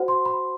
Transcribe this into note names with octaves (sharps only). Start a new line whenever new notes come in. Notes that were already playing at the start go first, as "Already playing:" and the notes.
Already playing: F#4 C5 F#5
C6
B5